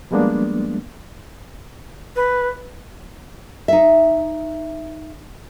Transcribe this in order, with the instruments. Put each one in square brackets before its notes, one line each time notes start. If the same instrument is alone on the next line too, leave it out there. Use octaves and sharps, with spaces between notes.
[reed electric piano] F3 G3 G#3 A#3 B3 D4
[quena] B4
[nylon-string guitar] D#4 E5